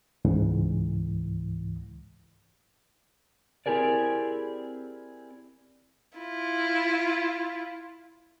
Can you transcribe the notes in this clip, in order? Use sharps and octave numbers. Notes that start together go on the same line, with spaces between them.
C#2 G#2 E3
C4 E4 G4 G#4 A#4 D5
E4 F4